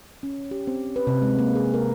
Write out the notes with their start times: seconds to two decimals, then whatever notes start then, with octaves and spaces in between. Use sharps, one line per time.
0.23 C#4
0.51 G4
0.67 C4
0.96 B4
1.07 C3
1.22 G#3
1.39 A#3
1.55 G#4
1.74 A#4